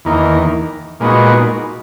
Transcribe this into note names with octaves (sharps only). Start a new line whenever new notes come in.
E2 D#3 A#3
A#2 G#3 B3 D#4 F#4